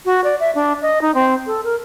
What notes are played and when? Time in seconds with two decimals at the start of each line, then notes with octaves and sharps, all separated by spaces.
0.05 F#4
0.24 D5
0.40 E5
0.55 D4
0.82 D#5
1.02 D#4
1.15 C4
1.46 A4
1.64 A#4